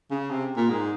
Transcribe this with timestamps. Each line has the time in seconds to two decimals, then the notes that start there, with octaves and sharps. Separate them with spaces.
0.11 C#3
0.31 C3
0.57 A#2
0.70 G#2